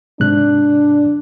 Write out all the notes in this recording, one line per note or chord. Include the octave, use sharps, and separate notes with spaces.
G#2 C3 D4 F#6